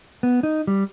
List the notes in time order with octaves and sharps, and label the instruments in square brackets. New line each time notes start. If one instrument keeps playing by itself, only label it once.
[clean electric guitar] B3
D#4
G3